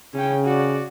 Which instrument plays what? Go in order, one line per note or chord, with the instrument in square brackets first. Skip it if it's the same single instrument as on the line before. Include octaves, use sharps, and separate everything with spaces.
[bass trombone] C#3 [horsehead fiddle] C#4 G5
[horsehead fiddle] F#4 D5